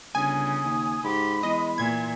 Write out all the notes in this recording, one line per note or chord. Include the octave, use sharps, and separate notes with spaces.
G1 C#3 G#5 D#6
D#2
G#2 G4 B5
E2 G#3 D#5
A#2 E3 G#6